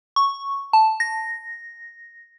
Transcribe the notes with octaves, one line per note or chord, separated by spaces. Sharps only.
C#6
A5
A#6